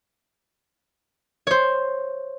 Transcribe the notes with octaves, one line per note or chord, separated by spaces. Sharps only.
C5 C#5